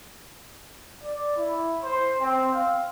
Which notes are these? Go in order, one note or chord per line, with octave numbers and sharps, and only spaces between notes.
D5
E4
C5
C4
F5